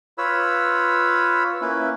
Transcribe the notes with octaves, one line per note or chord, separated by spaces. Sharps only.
F4 B4 C#5 B5 E6
A#3 C#4 E4 B4